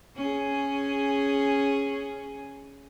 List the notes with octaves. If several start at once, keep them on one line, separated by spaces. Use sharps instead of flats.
C#4 G#4